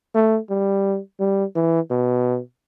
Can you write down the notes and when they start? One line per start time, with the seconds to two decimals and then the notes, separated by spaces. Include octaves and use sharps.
0.15 A3
0.50 G3
1.20 G3
1.56 E3
1.91 B2